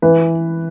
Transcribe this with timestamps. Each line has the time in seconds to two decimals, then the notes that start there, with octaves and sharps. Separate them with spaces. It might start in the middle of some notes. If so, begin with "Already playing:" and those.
0.02 E3 B4